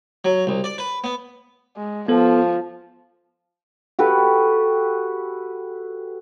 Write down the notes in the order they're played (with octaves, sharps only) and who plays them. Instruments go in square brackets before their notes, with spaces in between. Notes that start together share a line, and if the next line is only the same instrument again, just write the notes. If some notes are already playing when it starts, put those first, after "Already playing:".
[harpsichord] F#3
C2
D5
B4
B3
[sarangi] G#3
[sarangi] F3 [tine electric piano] B3 A4
[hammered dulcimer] F#4 G4 A4 B4